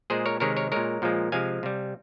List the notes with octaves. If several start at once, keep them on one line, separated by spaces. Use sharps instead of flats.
A#2 G#3 G#4 C5
A#4 C#5
C3 D#3 G#3 A#4 C#5
A#4 C#5
A#2 G#3 A#4 C#5
A#2 F3 G#3
C3 F3 G#3 F5 G#5
C3 G3